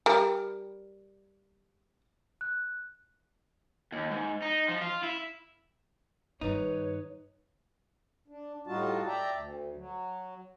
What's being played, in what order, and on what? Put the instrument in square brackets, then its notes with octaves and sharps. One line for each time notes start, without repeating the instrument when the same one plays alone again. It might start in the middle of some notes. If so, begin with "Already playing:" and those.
[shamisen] G3 A#4
[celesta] F#6
[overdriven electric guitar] D#2
G#2
D#4
F3
F4
E4
[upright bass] G2 D#3 [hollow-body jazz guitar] D#4 [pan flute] B4 [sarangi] C#5
[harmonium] D4
A2 G3 D#4 F4 F#4 A5
D5 E5 G5 A5 A#5
D2
F#3